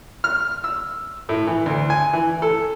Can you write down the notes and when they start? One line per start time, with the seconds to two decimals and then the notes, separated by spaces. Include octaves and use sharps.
0.24 F6
0.64 E6
1.29 A2
1.47 E3
1.66 D2
1.90 G#5
2.13 E3
2.42 A4